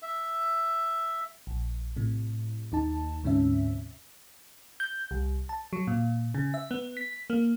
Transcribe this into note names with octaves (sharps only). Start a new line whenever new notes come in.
E5
A#1
A2 C3
D#2 D#4 A5
D2 G#2 C3 C#4 E5
G6
C2
A5
F#3
A#2
C#3
E5
B3
B6
A#3